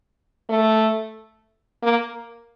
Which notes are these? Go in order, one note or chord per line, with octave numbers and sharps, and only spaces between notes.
A3
A#3